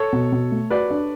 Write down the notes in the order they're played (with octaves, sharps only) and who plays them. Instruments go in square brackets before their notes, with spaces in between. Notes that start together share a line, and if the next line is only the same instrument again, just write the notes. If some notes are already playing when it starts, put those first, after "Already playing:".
Already playing: [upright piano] A4 C#5
[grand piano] B2
B2
A3
[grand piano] F#4 [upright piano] B4 D5
[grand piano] D4